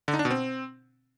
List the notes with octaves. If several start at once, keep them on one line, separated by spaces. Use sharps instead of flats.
D3
D#4
D4
B2
C4